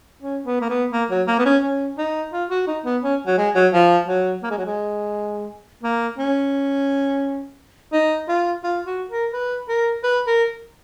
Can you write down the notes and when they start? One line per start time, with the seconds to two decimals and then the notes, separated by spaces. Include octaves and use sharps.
0.22 C#4
0.46 B3
0.61 A#3
0.69 B3
0.92 A#3
1.10 F#3
1.28 A#3
1.39 B3
1.46 C#4
1.63 C#4
1.98 D#4
2.33 F4
2.50 F#4
2.68 D#4
2.85 B3
3.03 C#4
3.27 F#3
3.38 G#3
3.56 F#3
3.73 F3
4.08 F#3
4.43 A#3
4.51 G#3
4.58 F#3
4.66 G#3
5.83 A#3
6.18 C#4
7.93 D#4
8.29 F4
8.63 F4
8.87 F#4
9.10 A#4
9.33 B4
9.68 A#4
10.04 B4
10.27 A#4